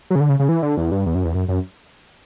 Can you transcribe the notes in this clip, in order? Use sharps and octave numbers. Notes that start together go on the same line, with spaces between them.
F#3
C#3
D3
C#3
C#3
E3
D3
E2
G2
E2
F#2
E2
F#2
F#2